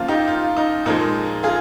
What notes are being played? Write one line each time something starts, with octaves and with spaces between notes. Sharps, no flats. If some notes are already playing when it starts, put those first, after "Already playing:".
Already playing: C#3 F3 A#3 F4
D#4 G4
F4
D#4
A#2 F3 G#3 D#4
F4 G#4